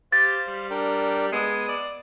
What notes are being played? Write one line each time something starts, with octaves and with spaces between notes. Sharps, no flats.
G4 C5 F5 A6
G3
D4 A#4 G5
G#3 B3 D#6 E6
D5